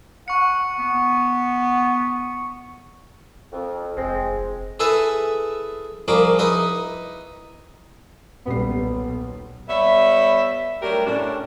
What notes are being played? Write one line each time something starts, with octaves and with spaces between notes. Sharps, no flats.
F#5 C#6 C#7
B3
F2
F1 G#3 C4
E4 G#4 A4 B4 E5 G#5
C2 F3 G#4 A#4 B5 D6
D#4 E4 B4 D#5
D#1 B1 G3 B3 C7
G3 B3 C#5 E5
F#3 G3 A3 D4 G4 A#4
A2 C#4 D4